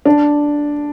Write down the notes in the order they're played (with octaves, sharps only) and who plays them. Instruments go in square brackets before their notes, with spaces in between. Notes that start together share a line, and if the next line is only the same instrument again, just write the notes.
[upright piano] D4